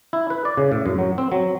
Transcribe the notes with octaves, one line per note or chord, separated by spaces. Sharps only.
E4
B4
D5
C#3
A2
F#2
F#3
C4
F#3